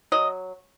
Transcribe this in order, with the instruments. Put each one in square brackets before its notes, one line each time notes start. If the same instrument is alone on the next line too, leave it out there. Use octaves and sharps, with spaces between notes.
[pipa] F#3 D#5